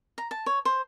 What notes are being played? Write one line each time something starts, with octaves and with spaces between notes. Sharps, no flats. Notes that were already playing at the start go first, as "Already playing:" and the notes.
A#5
A5
C#5
C5